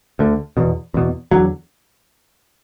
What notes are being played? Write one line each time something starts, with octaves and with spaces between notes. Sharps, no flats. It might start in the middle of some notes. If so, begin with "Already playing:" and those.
D2 D3
E2 B2
E2 B2
E2 D3 F#3